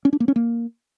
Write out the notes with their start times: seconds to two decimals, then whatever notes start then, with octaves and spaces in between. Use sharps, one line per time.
0.05 C#4
0.13 D4
0.20 A#3
0.28 C#4
0.36 A#3